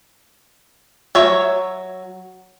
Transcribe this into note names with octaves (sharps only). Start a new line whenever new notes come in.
F#3 C#5 E5